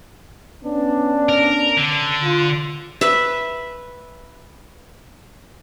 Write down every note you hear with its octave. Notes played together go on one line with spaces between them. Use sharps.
B3 C#4 D4
A#4
D3
F4
B4 E5